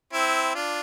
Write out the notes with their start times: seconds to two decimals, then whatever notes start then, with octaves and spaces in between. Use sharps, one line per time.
0.13 C4 E4
0.55 D4 F4